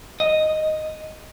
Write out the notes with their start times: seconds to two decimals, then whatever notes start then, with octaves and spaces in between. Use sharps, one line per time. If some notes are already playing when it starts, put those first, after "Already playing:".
0.20 D#5